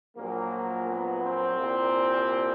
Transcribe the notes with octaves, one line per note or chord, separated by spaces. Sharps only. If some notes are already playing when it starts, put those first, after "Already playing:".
A#1 A#2 F#3 A#3
B3
C4
C2 A#2 G3 A#3